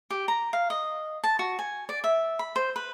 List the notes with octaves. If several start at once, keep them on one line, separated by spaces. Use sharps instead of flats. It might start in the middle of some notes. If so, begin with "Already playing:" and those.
G4
A#5
F5
D#5
A5
F#4
G#5
D5
E5
B5
C5
B4